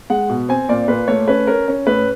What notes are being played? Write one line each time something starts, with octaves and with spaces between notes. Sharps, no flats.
G#3 F#5
B2
C4 G#5
A#2 D5
A#2 B4
A3 C#5
C#4 B4
C#4 A#4
C#4
A2 B4